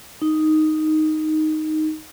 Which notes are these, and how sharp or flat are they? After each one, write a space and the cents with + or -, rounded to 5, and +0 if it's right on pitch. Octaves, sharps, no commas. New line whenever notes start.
D#4 +0